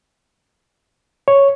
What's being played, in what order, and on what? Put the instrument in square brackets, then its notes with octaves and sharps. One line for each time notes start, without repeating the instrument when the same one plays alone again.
[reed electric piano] C#5